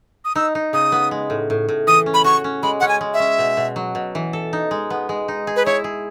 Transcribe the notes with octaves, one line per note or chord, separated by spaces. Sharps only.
D#6
D#4 E6
D#4
C#3 D#6
B3
G#3
A2
A2
A2
E3 D#6
C#4
B5
F#4 C#6
C#4
G#3 B5
C#4 F#5
G#5
G#3
E5
C#4
B2
B2
F#3
B2
E3
A4
D#4
G#3
B3
G#3
D#4
G#4
B4
E4 C#5
G#4